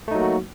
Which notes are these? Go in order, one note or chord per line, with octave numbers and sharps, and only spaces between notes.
F#3 A3 A#3 D#4 F#4